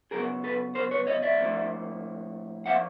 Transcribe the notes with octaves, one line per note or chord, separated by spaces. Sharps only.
C#3 F#3 B3 G#4 A#4
A4 B4
A#4 C5
B4 C#5
C#5 D#5
D5 E5
A2 F3 A#3
F3 A#3 E5 F#5